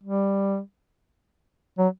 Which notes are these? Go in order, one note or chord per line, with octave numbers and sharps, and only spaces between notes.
G3
F#3